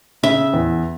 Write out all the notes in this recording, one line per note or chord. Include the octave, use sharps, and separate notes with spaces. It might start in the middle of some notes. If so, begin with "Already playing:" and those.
C#3 E5
E2